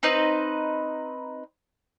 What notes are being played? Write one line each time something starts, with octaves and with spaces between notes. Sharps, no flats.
C4 D#4 B4 D#5